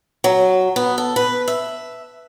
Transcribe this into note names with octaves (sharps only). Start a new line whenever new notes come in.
F#3
B3
A4
B4
E5